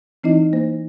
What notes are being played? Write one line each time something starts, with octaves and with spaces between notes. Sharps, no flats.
E3 C4 D#4 E4 D#5
A#3 C5